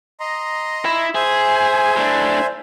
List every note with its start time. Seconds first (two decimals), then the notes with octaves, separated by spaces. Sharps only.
0.20 D#5 A#5 C6
0.85 E4
1.15 G#4 C5 E5 G#5
1.96 A2 D4